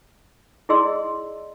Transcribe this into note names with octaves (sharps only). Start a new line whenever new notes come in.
E4 G#4 D5 D#5 C6 E6